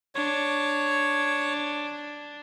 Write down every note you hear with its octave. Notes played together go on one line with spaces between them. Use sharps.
D4 C#5